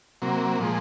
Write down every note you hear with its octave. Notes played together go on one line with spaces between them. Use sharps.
C3 F#3 A#3
A#2 F3 G#3